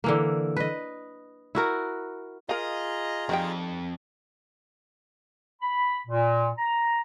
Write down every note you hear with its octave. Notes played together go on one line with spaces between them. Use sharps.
D3 E3 A#3
B4 D#5
E4 F#4 A#4
F4 G#4 A#4 D#5 F5 A#5
F2 D#3 G3 G5
B5
A#2
A#5